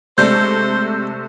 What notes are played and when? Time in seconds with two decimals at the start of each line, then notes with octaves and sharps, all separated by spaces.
0.18 C3 G#3 A3 D4 C5 G6